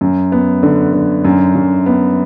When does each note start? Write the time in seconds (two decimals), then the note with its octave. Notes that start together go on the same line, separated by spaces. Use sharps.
0.01 F#2
0.32 B3
0.63 D3
0.94 D3
1.25 F#2
1.55 F#2
1.86 B3